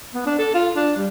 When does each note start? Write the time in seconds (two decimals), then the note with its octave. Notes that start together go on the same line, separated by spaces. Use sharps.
0.14 B3
0.26 D4
0.39 A4
0.54 F4
0.76 D4
0.96 G3